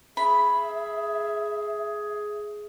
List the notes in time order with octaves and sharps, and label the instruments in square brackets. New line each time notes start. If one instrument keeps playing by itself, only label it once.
[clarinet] G#4 [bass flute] E5 [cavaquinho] B5